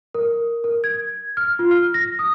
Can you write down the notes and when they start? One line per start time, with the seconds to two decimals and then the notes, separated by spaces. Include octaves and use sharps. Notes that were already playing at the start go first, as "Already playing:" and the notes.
0.14 A#4
0.64 A#4
0.84 G#6
1.37 F6
1.59 F4
1.71 F6
1.94 A#6
2.19 D#6